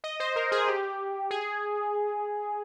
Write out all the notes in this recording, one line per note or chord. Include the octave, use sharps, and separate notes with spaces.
D#5
C5
A#4
G#4
G4
G#4